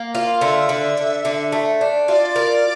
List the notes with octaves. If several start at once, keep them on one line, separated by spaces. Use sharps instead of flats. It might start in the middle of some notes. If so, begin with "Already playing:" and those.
Already playing: A#3
F4
D3 E5
D3
D3
D3
A3
D4
F4 D5 E5
A#4